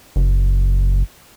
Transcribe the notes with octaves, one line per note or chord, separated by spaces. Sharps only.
F#1